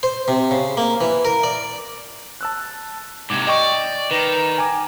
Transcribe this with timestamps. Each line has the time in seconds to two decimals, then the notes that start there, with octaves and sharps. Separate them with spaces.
0.03 C5
0.28 C3
0.51 C#3
0.77 A#3
1.01 E3
1.25 A#4
1.44 D5
2.41 A5 E6 F#6
3.30 G#2 C3 D6 G#6
3.47 D5 D#5 G5 C#6
4.11 D#3 B4
4.58 G#5 A#5 D6